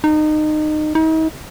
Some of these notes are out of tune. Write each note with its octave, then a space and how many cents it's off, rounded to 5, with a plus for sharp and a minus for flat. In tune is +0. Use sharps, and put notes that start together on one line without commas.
D#4 -25
D#4 +40